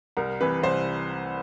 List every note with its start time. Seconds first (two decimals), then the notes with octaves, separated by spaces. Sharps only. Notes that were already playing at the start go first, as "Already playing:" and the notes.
0.17 C2 A#4
0.40 C3 E3 B4
0.63 C2 C5